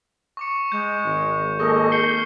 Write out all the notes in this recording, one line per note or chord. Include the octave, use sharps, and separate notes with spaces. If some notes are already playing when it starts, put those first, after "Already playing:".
C#6 D6 C#7
G#3 G6
G#1
A#3 G#4 A4 D#5 C#6
G6 C7 C#7